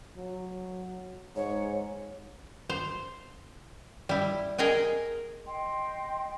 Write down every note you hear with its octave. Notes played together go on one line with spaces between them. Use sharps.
F#3
G#2 C#5
C5
G3 E4
G#4 A#4 D#5 G5 G#5
D#5 G5 C6